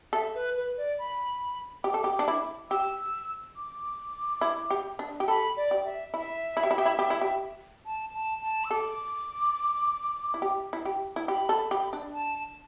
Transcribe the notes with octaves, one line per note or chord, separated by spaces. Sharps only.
A4 E5
B4
B4
D5
B5
G4 D6
A4
G4
D4
E4
G4 E6
D6
E4
G4
D4
G4
A4 B5
D5
G4
E5
E4 E5
E4
G4
E4
G4
E4
G4
E4
G4
A5
A5
A5
E6
A4 D6
E4
G4
E4
G4
E4
G4 B5
A4
G4
D4
A5